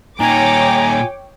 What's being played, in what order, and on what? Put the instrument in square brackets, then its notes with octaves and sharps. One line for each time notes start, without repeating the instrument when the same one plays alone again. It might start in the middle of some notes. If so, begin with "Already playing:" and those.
[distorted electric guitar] A#2 D#4 [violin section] C#5 G5 D6 [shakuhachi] G#5 [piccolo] A#5